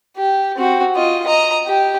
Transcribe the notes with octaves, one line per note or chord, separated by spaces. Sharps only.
G4
C4 F#4
F4 D#5
D#5 A#5
G4